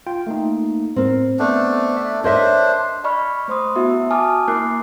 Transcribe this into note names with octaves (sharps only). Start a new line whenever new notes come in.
F4 G5
A3 A#3 D#4
A2 C4 A#4
A3 B3 D4 C5
E5
D4 A#4 C5 C#5 D#5 E5
D5 D#5 B5 C#6 F6
A3 C5 C6 D#6
B3 E4 F#4 E5
G#5 A5 D6 D#6 F6
A#3 E4 A#4 D6 F#6 C7